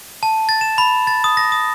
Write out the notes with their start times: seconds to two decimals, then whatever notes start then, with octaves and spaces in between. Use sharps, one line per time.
0.23 A5
0.49 A6
0.61 E7
0.78 B5
1.07 A6
1.24 D#6
1.37 A#6
1.52 D#6